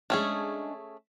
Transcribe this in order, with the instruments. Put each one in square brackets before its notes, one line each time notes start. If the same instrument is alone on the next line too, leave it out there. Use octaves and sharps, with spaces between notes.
[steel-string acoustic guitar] G#3 D4 [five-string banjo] A3 C#4 G#4